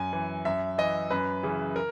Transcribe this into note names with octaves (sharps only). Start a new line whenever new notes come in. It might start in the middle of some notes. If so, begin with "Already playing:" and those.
Already playing: F#2 G#5
E3
F#2 E5
E3 D#5
F#2 B4
C#3 E3
A#4